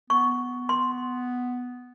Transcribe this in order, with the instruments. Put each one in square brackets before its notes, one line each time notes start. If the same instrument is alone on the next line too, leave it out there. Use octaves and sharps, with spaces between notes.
[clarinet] B3 [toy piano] C#6
[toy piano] C6